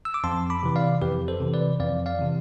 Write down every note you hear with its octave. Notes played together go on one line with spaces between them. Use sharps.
E6
D6
F2 A5 C6
B5 D6
C3 E3
D5 F5
F2 G4 B4
A4 C5
C3 E3
B4 D5
F2 D5 F5
D5 F5
C3 E3